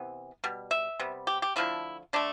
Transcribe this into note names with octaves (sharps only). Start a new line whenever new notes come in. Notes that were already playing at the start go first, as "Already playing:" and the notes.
Already playing: C3 E3 B3
B2 G3
E5
C3 G3 B3
G4
G4
D3 F3 A3 E4
D3 A3 D4